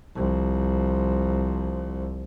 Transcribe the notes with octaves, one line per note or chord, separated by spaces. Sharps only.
C2 F3